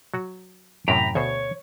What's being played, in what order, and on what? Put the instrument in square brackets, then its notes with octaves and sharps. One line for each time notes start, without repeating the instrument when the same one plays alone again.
[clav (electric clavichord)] F#3 F#4
[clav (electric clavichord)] F#2 A2 C3 [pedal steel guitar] G5 A#5 B5
[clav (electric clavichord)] D2 B2 C5 [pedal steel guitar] C#5